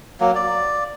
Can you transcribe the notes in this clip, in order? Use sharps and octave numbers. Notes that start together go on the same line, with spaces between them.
F#3 A#3
D5